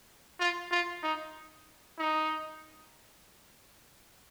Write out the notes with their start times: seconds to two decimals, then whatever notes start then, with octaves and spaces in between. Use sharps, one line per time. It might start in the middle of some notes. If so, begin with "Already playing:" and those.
0.40 F4
0.71 F4
1.03 D#4
1.99 D#4